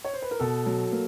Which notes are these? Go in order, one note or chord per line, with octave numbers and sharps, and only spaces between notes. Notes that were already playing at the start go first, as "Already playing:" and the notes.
C#5
C5
B4
A#4
B2 A4
F#3
A#3